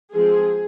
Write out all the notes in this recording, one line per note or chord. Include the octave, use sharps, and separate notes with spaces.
F3 G#3 C4 G#4